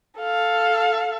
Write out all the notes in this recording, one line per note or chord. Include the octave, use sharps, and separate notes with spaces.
A4 F5